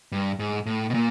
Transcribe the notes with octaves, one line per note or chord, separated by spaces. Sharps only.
G2
G#2
A2
B2
A#2